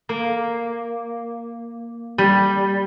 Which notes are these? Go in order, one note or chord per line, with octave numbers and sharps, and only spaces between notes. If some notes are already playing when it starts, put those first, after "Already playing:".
A#3
G3